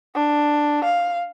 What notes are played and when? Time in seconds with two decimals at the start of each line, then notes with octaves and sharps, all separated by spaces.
0.15 D4
0.85 F5